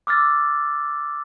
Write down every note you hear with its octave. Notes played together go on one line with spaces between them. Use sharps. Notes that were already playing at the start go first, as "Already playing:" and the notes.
D6 E6 F6 A6